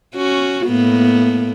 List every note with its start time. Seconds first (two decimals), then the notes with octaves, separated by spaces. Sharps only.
0.15 C#4 F#4
0.67 A2 A#3 B3